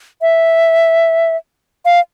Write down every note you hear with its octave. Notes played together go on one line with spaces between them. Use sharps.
E5
F5